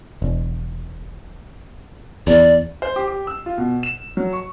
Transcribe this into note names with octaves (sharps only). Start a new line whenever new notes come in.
E1
E2 D5
C5
G4
G4
E6
F4
B2
E7
F#3
C#6